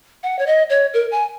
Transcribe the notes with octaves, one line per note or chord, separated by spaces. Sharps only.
F#5
C#5
D#5
C#5
A#4
G#5